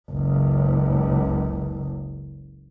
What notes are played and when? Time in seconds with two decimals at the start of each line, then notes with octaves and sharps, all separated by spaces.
0.11 F#1 C#2